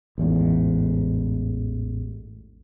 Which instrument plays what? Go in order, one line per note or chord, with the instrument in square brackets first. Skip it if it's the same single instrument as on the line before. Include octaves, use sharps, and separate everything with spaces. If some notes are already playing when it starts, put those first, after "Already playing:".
[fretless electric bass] A1 E2 G#2